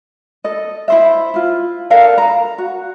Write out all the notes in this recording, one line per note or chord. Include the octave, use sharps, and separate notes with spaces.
A4 D#5
E4 C5 E5
E4 F4
D4 A4 A#4 F5
A#5
F#4